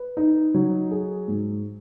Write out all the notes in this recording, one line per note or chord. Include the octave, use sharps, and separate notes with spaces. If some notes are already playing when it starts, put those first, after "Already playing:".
Already playing: B4
D#4
F#3
G#4
G#2